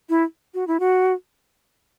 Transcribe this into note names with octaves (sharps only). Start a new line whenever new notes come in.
E4
F#4
E4
F#4